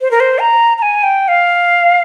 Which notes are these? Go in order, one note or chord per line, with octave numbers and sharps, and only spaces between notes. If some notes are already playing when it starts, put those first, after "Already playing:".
C5
A#4
C5
A#5
A#5
G#5
G5
F5